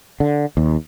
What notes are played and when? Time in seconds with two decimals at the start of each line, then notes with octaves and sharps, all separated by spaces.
0.20 D3
0.57 D#2